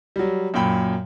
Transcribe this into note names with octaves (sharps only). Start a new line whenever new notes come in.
F#3 G3
F#2 A#2 G5 B5